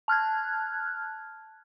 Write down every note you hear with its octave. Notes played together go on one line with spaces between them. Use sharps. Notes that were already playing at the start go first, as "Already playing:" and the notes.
A5 F6 F#6 G#6